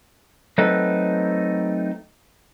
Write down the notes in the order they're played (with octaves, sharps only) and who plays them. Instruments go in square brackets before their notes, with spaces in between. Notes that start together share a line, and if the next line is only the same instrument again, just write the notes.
[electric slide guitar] F#3 A3 C4 D#4 A4 B4